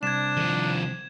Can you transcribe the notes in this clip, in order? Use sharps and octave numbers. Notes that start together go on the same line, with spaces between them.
C2 D4 G#6 E7
D#3 F3